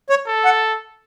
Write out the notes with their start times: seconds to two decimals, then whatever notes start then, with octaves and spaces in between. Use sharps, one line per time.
0.10 C#5
0.27 A4
0.45 F#5